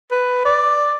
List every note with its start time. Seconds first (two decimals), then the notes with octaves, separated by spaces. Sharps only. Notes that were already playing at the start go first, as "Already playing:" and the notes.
0.11 B4
0.45 D5